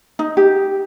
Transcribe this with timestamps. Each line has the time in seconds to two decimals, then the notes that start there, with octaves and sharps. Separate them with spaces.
0.19 D#4
0.37 G4